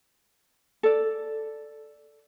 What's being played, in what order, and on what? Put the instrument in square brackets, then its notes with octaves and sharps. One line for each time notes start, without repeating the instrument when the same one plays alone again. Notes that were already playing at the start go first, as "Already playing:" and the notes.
[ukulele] A4 D5